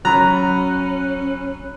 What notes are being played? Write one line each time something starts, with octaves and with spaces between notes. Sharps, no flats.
F#3 C#4 A#5 B5 F#6